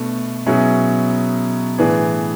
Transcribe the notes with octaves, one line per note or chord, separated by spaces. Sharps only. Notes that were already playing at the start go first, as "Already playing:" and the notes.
Already playing: B2 A3 D4
B2 F#3 C#4 E4 G#4
A2 E3 B3 D4 G#4